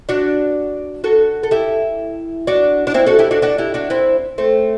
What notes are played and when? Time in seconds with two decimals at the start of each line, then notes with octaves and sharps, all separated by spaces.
0.09 D4 F#4
1.04 F#4 A4
1.43 A4
1.51 E4 G4
2.47 D4 F#4
2.87 D4
2.94 C4 E4
3.06 F#4 A4
3.19 E4 G4
3.31 D4 F#4
3.42 D4 F#4
3.58 E4 G4
3.74 D4 F#4
3.90 C4 E4
4.38 A3 C4